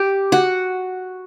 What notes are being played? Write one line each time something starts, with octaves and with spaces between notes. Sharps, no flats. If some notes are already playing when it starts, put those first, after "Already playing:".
Already playing: G4
F#4